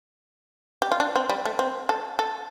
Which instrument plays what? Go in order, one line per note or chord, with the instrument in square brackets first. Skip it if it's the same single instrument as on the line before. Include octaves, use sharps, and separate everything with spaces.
[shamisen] G4
F4
D4
C4
G3
A3
C4
A4
A4